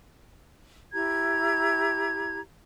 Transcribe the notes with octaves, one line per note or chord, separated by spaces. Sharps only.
E4 G4 A#5 G#6